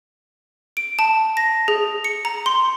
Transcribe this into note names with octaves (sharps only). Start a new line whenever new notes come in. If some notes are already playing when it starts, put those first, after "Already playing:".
D7
A5
A#6
G#4
C#7
A#5
C6